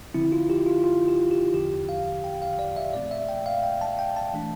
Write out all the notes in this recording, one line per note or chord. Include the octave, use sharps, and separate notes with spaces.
D3 F3 C4 E4
F4
G4
F4
F4
G4
G4
E2 D3 F3 G4
F5
G5
F5
D5
E5
A#2 A3 C4 D5
E5
G5
F5
G5
A5
G5
A5
E3 A3 D4